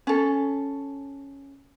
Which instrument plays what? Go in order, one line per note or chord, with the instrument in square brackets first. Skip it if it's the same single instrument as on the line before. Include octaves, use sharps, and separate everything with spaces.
[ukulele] C#4 A4